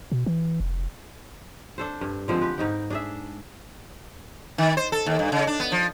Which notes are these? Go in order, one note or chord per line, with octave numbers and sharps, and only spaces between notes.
B2
E3
F1
D4 A4 C5
G2
D3 F3 G#3 C4
G4 B4
G#2 D#4 G5
D4 G#4 E5
D#3
C5
A4
D#2
G2
C#3
D4
B3
F3